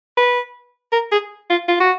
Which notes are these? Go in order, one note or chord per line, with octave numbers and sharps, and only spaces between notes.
B4
A#4
G#4
F4
F4
F#4